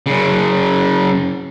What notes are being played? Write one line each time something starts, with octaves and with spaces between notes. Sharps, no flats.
F#2 C#3